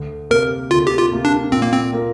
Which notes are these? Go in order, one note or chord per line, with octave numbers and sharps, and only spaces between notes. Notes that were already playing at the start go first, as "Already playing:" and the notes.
Already playing: D2
C3 A#3 G4 A#4
D2 F4
G4
F4
C3 A#3 G4
D4
A#2 C4
A#3
C4
A#3 F4 A#4